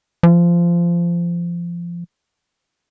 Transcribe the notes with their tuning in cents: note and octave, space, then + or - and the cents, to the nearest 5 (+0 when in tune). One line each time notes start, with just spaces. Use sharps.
F3 -20